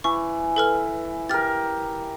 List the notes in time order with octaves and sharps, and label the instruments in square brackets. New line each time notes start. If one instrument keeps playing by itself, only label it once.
[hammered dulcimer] E3 [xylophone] C#6
[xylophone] A4 B4 F6
[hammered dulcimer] G4 A#4 [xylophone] F6 A6